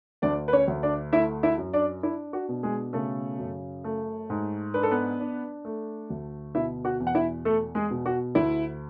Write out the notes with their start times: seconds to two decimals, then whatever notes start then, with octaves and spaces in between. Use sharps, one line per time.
0.22 D2 D4 D5
0.48 B4
0.53 C#4 C#5
0.68 D2
0.83 D4 D5
1.13 A3 E4 E5
1.43 E4 E5
1.58 F#2
1.73 D4 D5
2.03 D4 E4
2.33 F#4
2.49 B2
2.63 G#3 G#4
2.93 C#3 A3 A4
3.39 F#2
3.84 A3
4.30 G#2
4.74 D4 B4
4.83 A4
4.91 B3 B4
5.20 D4
5.65 A3
6.10 D2
6.55 B2 E4 E5
6.85 F#4 F#5
7.00 E2
7.07 F#5
7.15 E4 E5
7.45 A3 A4
7.75 G#3 G#4
7.91 B2
8.06 F#4
8.35 D2 E4